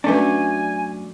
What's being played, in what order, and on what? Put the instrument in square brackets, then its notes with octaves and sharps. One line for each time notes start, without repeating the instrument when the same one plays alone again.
[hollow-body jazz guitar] F#2 A3 D4 [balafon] C#4 B4 [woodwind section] G#5